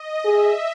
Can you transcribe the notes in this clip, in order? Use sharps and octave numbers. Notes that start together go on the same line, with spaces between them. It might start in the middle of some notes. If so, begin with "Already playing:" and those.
Already playing: D#5
G#4 E5